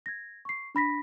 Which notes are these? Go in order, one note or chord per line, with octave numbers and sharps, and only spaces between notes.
G#6 A#6
C#6 C7
D4 B5 A#6 B6